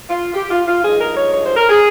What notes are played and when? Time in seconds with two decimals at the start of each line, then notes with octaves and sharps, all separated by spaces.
0.10 F4
0.34 G4
0.50 F4
0.67 F4
0.83 G2 F3 G#3 D#4 G#4
1.00 A#4
1.16 C#5
1.33 C#5
1.44 C5
1.57 A#4
1.69 G#4